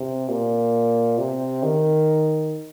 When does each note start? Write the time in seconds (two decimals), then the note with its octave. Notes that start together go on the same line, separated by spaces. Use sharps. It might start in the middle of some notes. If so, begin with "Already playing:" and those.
Already playing: C3
0.29 A#2
1.18 C3
1.63 D#3